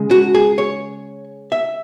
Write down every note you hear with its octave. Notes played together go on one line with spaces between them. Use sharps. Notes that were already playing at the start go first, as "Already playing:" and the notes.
Already playing: C#3 G#3
F#4
G#4
C#5
E5